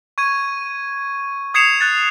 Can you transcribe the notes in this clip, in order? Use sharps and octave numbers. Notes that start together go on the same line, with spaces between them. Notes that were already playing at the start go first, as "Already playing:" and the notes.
C#6 G#6 D#7
D#6 G#6 C7 C#7 E7 F7
F#6 A6